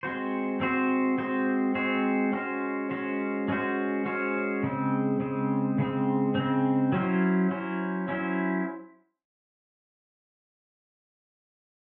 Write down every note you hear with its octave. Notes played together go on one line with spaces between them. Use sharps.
G#3 C4 F#4 C5
G#3 C4 F#4 C5
G#3 C4 F#4 C5
G#3 C4 F#4 C5
G#3 C#4 F#4 C5
G#3 C#4 F#4 C5
G#3 C#4 F#4 C5
G#3 C#4 F#4 C5
C#3 G#3 C4
C#3 G#3 C4
C#3 G#3 C4
C#3 G#3 C4
F#3 C#4 E4 C5
F#3 C#4 E4 C5
F#3 C#4 E4 C5